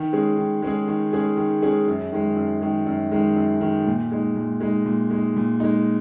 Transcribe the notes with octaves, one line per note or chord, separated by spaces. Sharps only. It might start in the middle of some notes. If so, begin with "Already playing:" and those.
Already playing: D#3
G#3 C#4 G#4
D#3
G#3 C#4 G#4
D#3
G#3 C#4 G#4
D#3
G#3 C#4 G#4
F#2
D#3 G#3
F#2
D#3 G#3
F#2
D#3 G#3
F#2
D#3 G#3
A#2
G#3 D#4
A#2
G#3 D#4
A#2
G#3 D#4
A#2
G#3 D#4